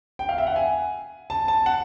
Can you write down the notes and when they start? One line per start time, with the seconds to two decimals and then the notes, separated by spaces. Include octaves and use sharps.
0.19 G5
0.29 F5
0.38 E5
0.47 F#5
0.56 G#5
1.30 A5
1.48 A5
1.66 F#5